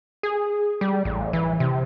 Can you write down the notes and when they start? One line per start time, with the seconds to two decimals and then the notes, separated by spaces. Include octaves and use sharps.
0.23 G#4
0.81 G3
1.05 A1
1.33 E3
1.60 C3